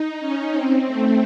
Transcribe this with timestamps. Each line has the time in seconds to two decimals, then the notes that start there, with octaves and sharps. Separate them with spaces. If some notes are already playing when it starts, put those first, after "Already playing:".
Already playing: D#4
0.20 C#4
0.53 C4
0.87 A3